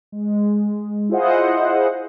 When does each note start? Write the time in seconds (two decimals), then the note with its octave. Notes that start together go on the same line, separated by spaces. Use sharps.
0.12 G#3
1.09 E4 F4 G#4 C5 D#5 F#5